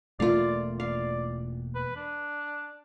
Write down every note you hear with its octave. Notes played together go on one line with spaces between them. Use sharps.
E1 A3 A#3 F4 D5 F5
D5 F5
B4
D4